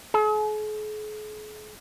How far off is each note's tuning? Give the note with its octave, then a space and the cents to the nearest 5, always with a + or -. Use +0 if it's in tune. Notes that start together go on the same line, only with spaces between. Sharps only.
G#4 +45